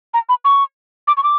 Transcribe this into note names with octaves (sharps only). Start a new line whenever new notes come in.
A#5
B5
C#6
D6
C#6
D6